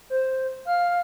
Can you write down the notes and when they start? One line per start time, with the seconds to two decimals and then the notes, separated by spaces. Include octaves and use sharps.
0.10 C5
0.67 F5 F6